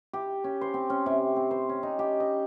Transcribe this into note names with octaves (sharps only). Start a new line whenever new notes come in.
G4
C#4
C5
C4
C#4
C3
C4
C5
C#4
D#4
G4
D#5